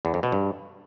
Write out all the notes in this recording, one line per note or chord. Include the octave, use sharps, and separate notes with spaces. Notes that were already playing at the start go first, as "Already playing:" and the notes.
E2
F2
B2
G2